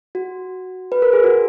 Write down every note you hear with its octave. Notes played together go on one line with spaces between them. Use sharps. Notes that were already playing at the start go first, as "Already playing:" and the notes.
F#4
B4
A#4
G#4
F#4